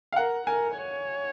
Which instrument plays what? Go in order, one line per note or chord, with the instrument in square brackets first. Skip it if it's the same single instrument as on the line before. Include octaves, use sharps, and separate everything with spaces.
[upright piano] F5
[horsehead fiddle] A#4 [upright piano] F#5
[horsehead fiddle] A#4 [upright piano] G#5
[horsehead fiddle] C#5